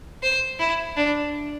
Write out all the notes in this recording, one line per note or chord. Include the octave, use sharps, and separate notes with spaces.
C5
E4
D4